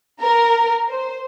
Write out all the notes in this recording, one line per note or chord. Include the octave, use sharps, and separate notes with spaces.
A#4
C5